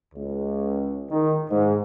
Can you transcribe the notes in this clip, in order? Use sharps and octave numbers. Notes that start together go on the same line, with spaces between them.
C#2
D#3
G#2